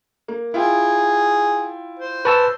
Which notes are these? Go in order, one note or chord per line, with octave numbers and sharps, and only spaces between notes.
A#3
E4 F4 G#4 G5
C5
B4 A5 C#6 E6